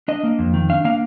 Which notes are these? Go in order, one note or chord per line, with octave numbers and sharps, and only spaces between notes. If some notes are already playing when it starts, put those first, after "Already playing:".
D4 D#5
A#3
F2
D#3
D4 F5
A#3 F5